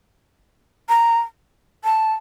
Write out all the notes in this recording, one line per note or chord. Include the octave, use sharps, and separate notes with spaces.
A#5
A5